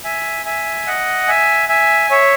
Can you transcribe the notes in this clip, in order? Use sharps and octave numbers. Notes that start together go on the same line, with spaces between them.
E5 G#5
E5 G#5
D#5 F#5
E5 G#5
E5 G#5
C#5 E5